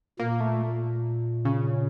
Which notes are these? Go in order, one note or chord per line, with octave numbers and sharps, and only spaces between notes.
A#2 A#3
A3
C#3